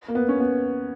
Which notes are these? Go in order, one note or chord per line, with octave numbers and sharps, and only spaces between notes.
A#3
B3
C#4
B3